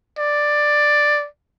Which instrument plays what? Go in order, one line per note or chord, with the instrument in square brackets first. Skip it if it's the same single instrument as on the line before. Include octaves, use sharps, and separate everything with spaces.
[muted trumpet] D5